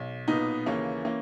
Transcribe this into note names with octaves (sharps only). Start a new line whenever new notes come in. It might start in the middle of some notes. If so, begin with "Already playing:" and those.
Already playing: B1
B1 A#2 B3 D#4
D#2 C#3 E3 A#3 C#4
E3 A#3 C#4